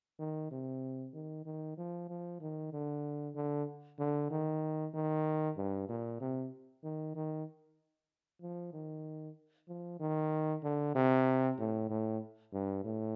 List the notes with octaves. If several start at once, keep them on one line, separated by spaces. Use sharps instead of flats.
D#3
C3
D#3
D#3
F3
F3
D#3
D3
D3
D3
D#3
D#3
G2
A#2
C3
D#3
D#3
F3
D#3
F3
D#3
D3
C3
A2
A2
G2
A2